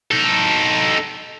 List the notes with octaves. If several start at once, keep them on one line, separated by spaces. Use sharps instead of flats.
D#4 A4